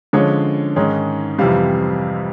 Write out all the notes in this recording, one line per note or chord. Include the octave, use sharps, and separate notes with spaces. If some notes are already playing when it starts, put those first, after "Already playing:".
D3 F3 G#3 C#4 C#5
G#2 D#3 G#3 C#4
F2 C3 E3 G3 F5